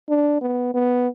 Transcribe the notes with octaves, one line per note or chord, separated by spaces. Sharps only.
D4
B3
B3